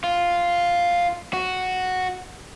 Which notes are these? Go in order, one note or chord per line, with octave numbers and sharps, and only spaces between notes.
F4
F#4